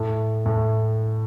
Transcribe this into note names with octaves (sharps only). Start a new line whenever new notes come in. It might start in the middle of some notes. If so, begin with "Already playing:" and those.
Already playing: A2
A2